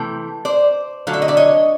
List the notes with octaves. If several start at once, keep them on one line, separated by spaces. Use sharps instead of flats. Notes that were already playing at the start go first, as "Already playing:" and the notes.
Already playing: C3 E3 A3 G5
C5 D5
D3 F#3 A3 F5
E5
D#5
D5 E5
C#5 D#5